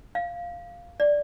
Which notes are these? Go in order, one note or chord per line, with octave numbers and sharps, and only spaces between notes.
F5
D5